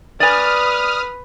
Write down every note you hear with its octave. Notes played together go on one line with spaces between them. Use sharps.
B4 D5 G#5 D#6 F6